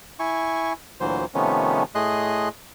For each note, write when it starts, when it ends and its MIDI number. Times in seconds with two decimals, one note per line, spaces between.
0.20 0.73 64
0.20 0.73 80
0.20 0.73 85
1.00 1.25 38
1.00 1.25 46
1.00 1.25 52
1.00 1.25 54
1.00 1.25 72
1.35 1.83 48
1.35 1.83 51
1.35 1.83 53
1.35 1.83 57
1.35 1.83 59
1.35 1.83 61
1.95 2.48 45
1.95 2.48 57
1.95 2.48 68
1.95 2.48 75
1.95 2.48 84
1.95 2.48 90